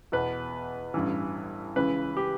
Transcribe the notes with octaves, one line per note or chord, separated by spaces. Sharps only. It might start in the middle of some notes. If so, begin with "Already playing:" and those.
E2 B2 B4
A1 G2 E3
C#2 C#3 E3 B4
G4